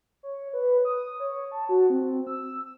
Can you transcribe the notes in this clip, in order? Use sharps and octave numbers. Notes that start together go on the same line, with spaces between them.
C#5
B4
D#6
C#5
A5
F#4
C4
E6